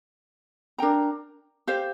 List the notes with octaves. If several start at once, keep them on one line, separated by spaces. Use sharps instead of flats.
D4 A#4 G5 A#5
G4 C5 F5